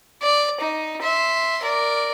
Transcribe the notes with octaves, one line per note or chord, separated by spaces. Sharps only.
D5
D#4
E5 C6
A#4 D5